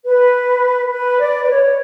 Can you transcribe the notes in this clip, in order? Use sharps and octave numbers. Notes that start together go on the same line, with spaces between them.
B4
B4
D5
B4
C#5